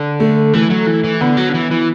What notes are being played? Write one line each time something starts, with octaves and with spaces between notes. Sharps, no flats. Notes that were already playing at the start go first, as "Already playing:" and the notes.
Already playing: D3
A3
E3 A3
F#3
E3
E3
D3 B3
F#3
D3
E3
E3